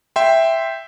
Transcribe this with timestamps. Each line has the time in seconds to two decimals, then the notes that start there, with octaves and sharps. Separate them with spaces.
0.16 E5 G5 C6